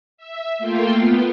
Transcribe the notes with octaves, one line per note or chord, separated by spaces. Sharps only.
E5
A3 A#3 F4 G5 C6
B3